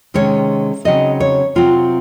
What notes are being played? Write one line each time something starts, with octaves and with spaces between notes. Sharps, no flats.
C3 D#3 G#3 C#4 C#5
C#3 F#3 C4 D#4 D#5
C#5
C3 F#3 C4 F4